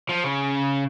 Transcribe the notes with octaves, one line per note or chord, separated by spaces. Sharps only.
F3
C#3